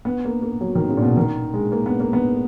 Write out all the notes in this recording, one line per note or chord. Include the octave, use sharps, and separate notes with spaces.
B3
A#3
A#3
F#3
D#3
C#3
A#2
B2
D#3
G#3
A#3
B3
A#3
B3